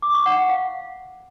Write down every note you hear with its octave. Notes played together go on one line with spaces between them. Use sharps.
D6
C#6
F#5
F#5
F5